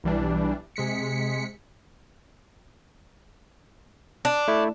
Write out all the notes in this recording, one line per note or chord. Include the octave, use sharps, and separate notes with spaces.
B1 E3 G3 D4
C3 G#3 B6 C#7
D4
A3 E4